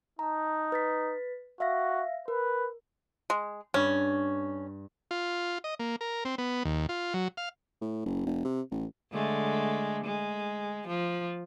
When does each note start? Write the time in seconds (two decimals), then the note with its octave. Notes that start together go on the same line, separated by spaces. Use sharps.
0.19 D#4 A5 A#5
0.72 B4 A6 B6
1.60 F#4 E5 F5 A#6
2.28 A#4 B4
3.30 G#3
3.74 G2 C#4
5.11 F4
5.64 D#5
5.79 A#3
6.01 A#4
6.25 C4
6.38 B3
6.65 D#2
6.89 F4
7.14 F#3
7.37 F5
7.82 A2
8.06 F#1
8.26 F1
8.45 C3
8.71 A1
9.13 D3 G#3 A3
10.04 G#3
10.88 F3